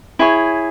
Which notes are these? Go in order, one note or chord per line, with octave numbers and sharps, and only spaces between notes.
E4 G#4 C#5